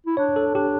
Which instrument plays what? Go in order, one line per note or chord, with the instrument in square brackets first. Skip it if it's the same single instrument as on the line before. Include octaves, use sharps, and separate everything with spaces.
[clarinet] E4
[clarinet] D4 [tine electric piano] C#5
[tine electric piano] A4
[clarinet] D4 [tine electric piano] G4